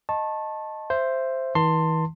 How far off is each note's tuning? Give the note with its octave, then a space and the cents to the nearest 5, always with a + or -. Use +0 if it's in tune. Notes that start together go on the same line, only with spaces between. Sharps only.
D#5 +0 A5 +0 C#6 -40
C5 +0 E5 +20
E3 -45 A5 +30 C6 +0